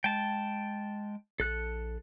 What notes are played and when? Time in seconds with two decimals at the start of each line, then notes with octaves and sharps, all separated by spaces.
0.04 G#3 G5 A5
1.40 A#1 A4 F#6